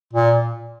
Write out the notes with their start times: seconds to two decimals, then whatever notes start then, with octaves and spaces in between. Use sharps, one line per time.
0.13 A#2